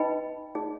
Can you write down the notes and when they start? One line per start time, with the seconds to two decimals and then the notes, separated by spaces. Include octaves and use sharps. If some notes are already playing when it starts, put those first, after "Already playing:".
Already playing: D#4 B4 D#5 G5 B5
0.55 D#4 G#4 D5